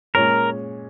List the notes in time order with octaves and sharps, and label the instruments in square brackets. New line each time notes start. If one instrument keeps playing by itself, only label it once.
[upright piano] A#2 G#3 C#4 G#4 C#5 [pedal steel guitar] A#4